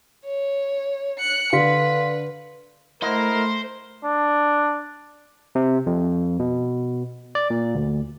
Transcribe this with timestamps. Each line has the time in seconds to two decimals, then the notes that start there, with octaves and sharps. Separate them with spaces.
0.25 C#5
1.18 F#6 C#7
1.53 D3 B4 F5 C6 B6
3.02 A3 E4 A#4 C5 D#5 F#5
4.05 D4
5.55 C3
5.86 F2
6.39 B2
7.35 D5
7.50 A#2
7.74 D2